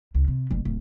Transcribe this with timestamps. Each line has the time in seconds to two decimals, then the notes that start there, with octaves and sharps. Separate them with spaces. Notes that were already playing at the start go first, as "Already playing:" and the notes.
0.15 C#2
0.28 C3
0.51 F#1
0.65 D1